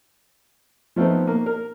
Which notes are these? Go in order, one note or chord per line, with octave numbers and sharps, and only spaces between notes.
F3 A3 B3 C4 D#4
A#3
A#4